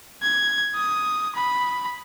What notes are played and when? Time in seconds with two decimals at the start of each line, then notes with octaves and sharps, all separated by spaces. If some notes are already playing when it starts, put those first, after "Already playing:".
0.23 G#6
0.75 D#6
1.36 B5